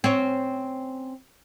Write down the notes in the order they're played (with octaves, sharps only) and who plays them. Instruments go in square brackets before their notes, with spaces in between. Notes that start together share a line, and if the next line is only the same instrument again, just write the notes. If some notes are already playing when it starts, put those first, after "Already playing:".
[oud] C4 C#4